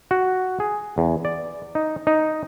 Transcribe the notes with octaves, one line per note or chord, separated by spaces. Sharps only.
F#4
G#4
E2
D5
D#4
D#4